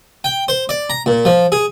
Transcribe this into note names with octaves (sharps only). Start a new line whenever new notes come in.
G5
C5
D5
A#5
A#2
F3
G#4